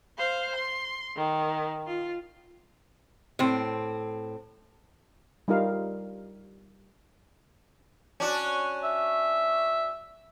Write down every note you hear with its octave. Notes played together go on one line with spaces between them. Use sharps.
C5 F5
C6
D#3
F4
A2 C4
G3 D#4 F4 A#4 F5
C#4 D4 F#4
E5